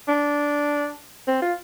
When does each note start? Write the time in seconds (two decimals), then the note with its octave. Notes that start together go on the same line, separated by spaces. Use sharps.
0.08 D4
1.27 C4
1.42 F4